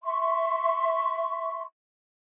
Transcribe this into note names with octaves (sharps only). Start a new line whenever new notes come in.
E5 C6 C#6